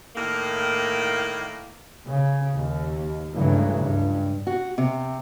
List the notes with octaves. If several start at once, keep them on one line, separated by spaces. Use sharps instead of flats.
A2 D#3 A#3
C#3
D#2
C#2 G2 C#3 E3 F#3 A3
C#2 G2
F#4
C3